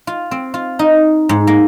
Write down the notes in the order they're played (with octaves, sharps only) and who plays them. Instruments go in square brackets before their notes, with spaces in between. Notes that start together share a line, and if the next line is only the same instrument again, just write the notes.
[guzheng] F4
C4
F4
D#4
G#2
A#3